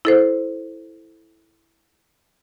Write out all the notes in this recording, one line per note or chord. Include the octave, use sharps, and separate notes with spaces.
E4 A4 C5